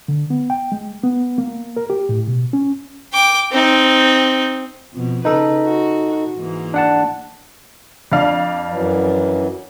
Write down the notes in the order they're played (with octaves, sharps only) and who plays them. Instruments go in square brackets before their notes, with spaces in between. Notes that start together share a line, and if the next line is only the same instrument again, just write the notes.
[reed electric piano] D3
B3
G5
G#3
B3
A#3
A#4
G4
A2
B2
C#4
[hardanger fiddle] G5 D6
C4 D#4
[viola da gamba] F2 B2
[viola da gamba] C#3 B4 [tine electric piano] D#4 A4
[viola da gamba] F#4
G#2 E3 A#3
[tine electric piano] D4 F#5 A5
[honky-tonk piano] F2 D4 F5
[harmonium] F#2 E3 F#3